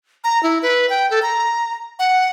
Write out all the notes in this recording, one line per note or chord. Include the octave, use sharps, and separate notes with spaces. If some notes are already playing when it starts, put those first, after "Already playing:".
A#5
E4
B4
G5
A4
A#5
F#5